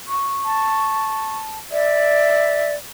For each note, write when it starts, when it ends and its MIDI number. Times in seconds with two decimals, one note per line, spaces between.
0.08 1.37 85
0.45 1.58 81
1.71 2.75 74
1.71 2.70 76